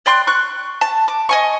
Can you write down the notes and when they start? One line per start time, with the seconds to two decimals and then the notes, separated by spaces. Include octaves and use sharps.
0.06 D5 G5 C6 F#6
0.27 C#6 F#6
0.81 A5
1.08 D6
1.29 D#5 G#5 C#6